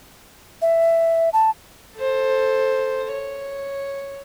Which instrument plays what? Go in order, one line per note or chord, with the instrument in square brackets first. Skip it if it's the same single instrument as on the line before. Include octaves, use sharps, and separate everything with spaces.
[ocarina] E5
A5
[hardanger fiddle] A4 C5
C#5